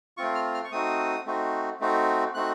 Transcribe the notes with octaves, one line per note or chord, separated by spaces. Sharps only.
A3 C4 F4 C#6
F6
F6
C#6
A3 C4 D#4 F#4 D#6
A3 C4 D#4 F#4
A3 C4 D#4 F#4
A3 C4 D#4 F#4 F#6